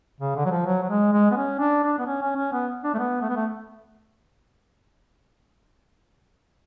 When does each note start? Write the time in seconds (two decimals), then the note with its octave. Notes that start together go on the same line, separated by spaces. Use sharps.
0.20 C#3
0.36 D3
0.45 F#3
0.51 F3
0.66 F#3
0.82 F#3
0.89 G#3
1.13 G#3
1.31 B3
1.37 C#4
1.59 D4
1.83 D4
1.99 B3
2.06 C#4
2.22 C#4
2.36 C#4
2.53 B3
2.84 D4
2.94 A3
2.99 B3
3.22 A3
3.29 B3
3.36 A3